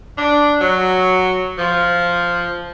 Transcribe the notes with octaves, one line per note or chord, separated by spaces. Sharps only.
D4
F#3
F3